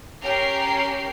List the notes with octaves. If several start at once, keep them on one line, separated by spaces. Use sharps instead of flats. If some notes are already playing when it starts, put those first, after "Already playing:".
C#4 G4 A#4 C7